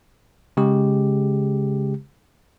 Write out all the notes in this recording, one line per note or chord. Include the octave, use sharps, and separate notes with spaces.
C#3 G#3 G4